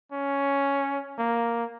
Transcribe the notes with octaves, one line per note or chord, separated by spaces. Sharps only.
C#4
A#3